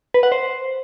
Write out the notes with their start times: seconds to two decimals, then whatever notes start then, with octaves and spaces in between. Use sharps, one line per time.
0.14 B4
0.23 F#5
0.32 C5